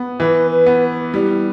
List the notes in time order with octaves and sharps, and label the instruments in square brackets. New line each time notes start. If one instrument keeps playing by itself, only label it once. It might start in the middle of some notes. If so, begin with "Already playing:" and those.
Already playing: [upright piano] B3
[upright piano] E3 [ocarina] B4
[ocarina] B4
[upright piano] B3
[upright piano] G3 [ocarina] E4